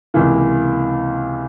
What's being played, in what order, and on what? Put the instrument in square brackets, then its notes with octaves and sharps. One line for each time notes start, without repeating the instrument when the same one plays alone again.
[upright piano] C#2 C3 E3 A#3